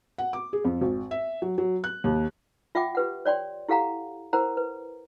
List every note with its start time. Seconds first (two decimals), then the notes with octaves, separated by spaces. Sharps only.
0.18 F#5
0.33 D6
0.53 G#4
0.65 F2
0.81 G#1
1.11 E5
1.42 F#3
1.58 F#3
1.84 F#6
2.04 D#2
2.75 F4 E5 F#5 G5 D6
2.95 G4 B4 F#5
3.26 C#5 D5 G5 C6
3.68 E4 G4 A4 F5 F#5 A#5
4.33 E4 A#4 C5 F#5 A#5
4.57 B4